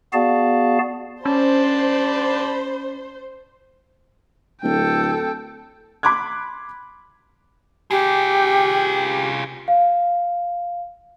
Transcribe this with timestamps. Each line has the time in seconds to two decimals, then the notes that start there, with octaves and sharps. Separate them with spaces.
0.13 B3 F#4 G#4 D5 F5 A5
1.25 C#4 C5 D5 A5 B5
4.63 D1 A4 G5
6.03 B5 C6 D6 F#6 G#6
7.91 F4 G4 G#4
9.68 F5